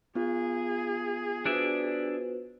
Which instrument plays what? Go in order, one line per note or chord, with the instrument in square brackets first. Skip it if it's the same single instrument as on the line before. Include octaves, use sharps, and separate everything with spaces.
[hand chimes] B3 F4 [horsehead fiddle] G#4
[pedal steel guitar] D4 D5 E5 [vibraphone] F#4 B4 C5